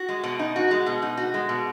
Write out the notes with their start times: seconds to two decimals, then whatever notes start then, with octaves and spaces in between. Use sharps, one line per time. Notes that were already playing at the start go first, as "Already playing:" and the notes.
Already playing: F#4
0.09 G#3
0.24 B2
0.39 D#4
0.56 F#4
0.71 G#3
0.86 B2
1.02 D#4
1.17 F#4
1.34 G#3
1.49 B2